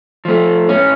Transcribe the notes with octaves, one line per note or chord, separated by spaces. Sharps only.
F3 A3
A2 C#4